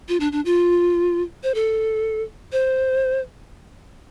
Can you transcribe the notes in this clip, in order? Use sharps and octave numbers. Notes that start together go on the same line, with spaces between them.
F4
D4
D4
F4
C5
A4
C5